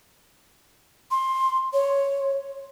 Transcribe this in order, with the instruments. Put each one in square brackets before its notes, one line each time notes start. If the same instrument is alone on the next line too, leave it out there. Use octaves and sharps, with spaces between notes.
[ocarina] C6
C#5